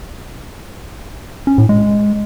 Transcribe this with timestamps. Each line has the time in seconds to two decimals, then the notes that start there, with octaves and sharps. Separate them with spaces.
1.47 C#4
1.58 A2
1.69 G#3